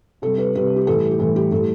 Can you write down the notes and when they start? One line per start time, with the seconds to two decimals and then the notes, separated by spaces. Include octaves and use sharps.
0.22 C3 G3 A4
0.38 B4
0.55 C3 G3 B4
0.76 G4
0.87 A2 E3 G3 A4
1.11 G4
1.19 A2 E3 G3 A4
1.36 G4
1.51 A2 G3 A4